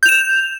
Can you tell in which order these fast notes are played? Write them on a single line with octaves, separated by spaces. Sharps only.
G6 F7 E7